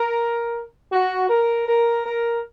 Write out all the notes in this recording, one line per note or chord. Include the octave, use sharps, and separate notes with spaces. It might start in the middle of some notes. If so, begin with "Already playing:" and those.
Already playing: A#4
F#4
A#4
A#4
A#4